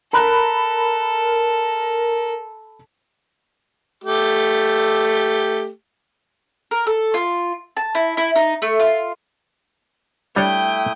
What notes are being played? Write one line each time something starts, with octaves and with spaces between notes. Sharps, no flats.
A4 A#4 A#5 B5 F#6
A3 G4
A#4
A4
F4
A5
E4
E4
D#4
A3
F4
G3 A3 D4 E4 C#5 G5 D#6